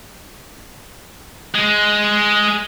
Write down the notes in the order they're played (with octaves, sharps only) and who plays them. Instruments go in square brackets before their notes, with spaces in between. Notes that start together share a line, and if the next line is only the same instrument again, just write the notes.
[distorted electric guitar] G#3